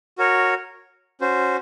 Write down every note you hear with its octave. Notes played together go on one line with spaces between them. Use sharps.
F#4 A#4 C#5
C#4 F#4 C5